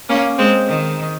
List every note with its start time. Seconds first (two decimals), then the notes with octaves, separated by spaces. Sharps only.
0.09 A#3 C#4
0.38 G#3 C4
0.67 D#3